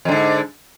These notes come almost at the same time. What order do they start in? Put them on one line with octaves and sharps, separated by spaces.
F2 D3 G#2